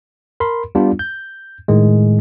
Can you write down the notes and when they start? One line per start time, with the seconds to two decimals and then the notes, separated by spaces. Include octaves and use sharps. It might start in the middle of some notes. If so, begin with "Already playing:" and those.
0.40 A#4 B5 C6
0.75 G3 B3 D4 F4
0.99 G6
1.68 A2 D#3 G#3